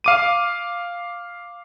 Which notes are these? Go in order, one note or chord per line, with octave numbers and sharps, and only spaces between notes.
F5 D6 D#7